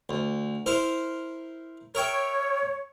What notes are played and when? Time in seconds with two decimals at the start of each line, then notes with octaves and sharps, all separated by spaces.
0.09 D2
0.66 E4 A#4 C5
1.95 A#4 C#5 E5 G5